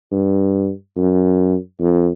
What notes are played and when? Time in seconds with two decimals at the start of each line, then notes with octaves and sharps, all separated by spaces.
0.11 G2
0.96 F#2
1.80 F2